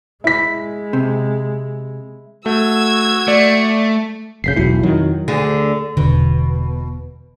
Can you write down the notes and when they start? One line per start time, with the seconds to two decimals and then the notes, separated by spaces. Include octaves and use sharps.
0.24 G#3 E4 B6
0.93 C3
2.46 A3 F#4 E6 G#6
3.28 A3 D5
4.44 F1 A#2 C#3 G6 B6 C7
4.56 E1 B1 E4 F#4
4.83 F2 D#3 F#3
5.28 D2 D3 G#4
5.97 E1 B2 D3